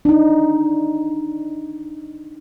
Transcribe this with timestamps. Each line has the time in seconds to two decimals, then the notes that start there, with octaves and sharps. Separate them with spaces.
0.05 D4 D#4